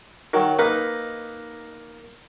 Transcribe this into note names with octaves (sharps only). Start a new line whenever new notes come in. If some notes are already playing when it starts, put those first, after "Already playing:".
D#3 F#3
A#3 D#4 B4